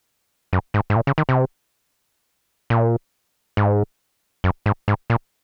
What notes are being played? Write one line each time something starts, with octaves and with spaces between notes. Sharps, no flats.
F#2
G#2
G#2
A#2
C#3
D#3
C3
A#2
G#2
F#2
G#2
G#2
A#2